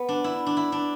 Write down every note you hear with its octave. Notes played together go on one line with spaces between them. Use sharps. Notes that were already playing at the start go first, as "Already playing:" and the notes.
Already playing: B3
D4
E4
D4
E4
D4